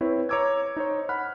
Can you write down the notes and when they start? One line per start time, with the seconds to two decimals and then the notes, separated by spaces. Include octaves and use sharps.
0.01 C4 E4 B4 C#5
0.29 C#5 A#5 D6 E6 G#6
0.76 D#4 C5 C#5
1.09 F#5 B5 F6 F#6